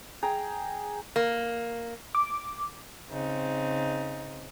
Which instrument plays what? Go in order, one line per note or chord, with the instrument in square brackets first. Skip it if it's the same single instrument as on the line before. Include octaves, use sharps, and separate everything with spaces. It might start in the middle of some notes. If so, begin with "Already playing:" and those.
[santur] G#4 G5 A#5
[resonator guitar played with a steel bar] A#3
[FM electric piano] D6
[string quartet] C#3 C4 D#4